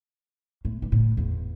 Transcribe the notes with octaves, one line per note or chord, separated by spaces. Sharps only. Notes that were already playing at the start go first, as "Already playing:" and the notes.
A2
G2
A2
E2